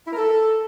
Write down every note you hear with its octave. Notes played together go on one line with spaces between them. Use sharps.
E4
A#4
A4